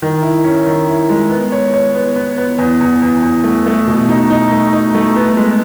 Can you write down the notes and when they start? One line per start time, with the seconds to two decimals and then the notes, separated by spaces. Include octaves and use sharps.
0.02 D#3
0.23 E4
0.44 C#4
0.67 D#3
0.88 E4
1.09 G#3
1.30 B3
1.52 C#5
1.74 C#5
1.94 B3
2.16 B3
2.38 B3
2.58 E2
2.81 E2
3.02 E2
3.22 E2
3.44 A3
3.66 A3
3.87 B2
4.09 D#4
4.30 D#4
4.52 A3
4.73 D#4
4.95 A3
5.16 B3
5.37 G#3